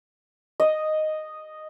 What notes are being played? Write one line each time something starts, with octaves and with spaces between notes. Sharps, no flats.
D#5